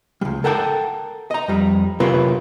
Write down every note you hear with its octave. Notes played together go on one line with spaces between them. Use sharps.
C#2 G3
A4 A#4 F#5 G5 A5
D#5 A#5
F2 G3
C3 F#3 F4 A#4 B4